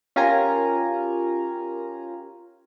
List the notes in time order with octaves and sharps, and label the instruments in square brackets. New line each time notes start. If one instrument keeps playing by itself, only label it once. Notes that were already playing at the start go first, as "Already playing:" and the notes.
[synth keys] C#4 F4 G4 A#4 G#5 A#5